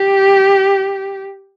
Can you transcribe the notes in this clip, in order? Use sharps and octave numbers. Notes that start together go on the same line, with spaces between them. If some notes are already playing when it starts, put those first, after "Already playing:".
Already playing: G4